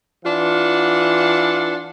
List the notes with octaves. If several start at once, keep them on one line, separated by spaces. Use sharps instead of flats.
E3 D4 F4 F#5